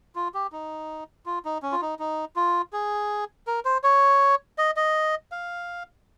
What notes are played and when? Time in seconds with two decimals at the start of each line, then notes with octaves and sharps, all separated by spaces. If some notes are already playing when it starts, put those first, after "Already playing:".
0.15 F4
0.34 G4
0.52 D#4
1.26 F4
1.45 D#4
1.63 C#4
1.72 F4
1.82 D#4
1.99 D#4
2.36 F4
2.73 G#4
3.47 A#4
3.65 C5
3.84 C#5
4.58 D#5
4.76 D#5
5.32 F5